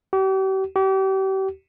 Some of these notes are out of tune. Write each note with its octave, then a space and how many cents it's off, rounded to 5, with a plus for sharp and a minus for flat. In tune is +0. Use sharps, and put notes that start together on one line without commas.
G4 -40
G4 -35